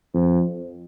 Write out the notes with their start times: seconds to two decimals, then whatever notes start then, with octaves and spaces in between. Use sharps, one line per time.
0.14 F2